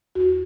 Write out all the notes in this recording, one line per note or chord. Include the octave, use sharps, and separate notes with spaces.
E2 F#4